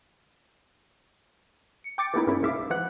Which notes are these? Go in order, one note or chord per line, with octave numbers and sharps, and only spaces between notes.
C#7
G5 D6 A6 C#7 D7
E3 G#3 A#3 B3 D#4 E4
G2 C#3 A#3 C#4 E4
C2 A#2 G#3 E5 F5 D6
E3 F3 F#5 F#6